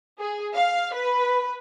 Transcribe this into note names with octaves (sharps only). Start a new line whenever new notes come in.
G#4
F5
B4